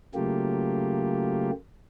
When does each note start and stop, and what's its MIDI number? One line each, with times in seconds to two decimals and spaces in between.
0.15 1.51 49
0.15 1.51 54
0.15 1.51 57
0.15 1.51 58
0.15 1.51 65
0.15 1.51 67